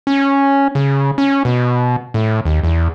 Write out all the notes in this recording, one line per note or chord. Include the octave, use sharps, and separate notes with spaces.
C#4
C#3
C#4
B2
A2
D#2
E2